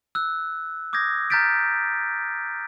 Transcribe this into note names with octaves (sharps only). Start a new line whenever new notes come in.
E6 F#6
D6 D#6 G6 G#6 A#6
A#5 F6 G6 A6 B6 D7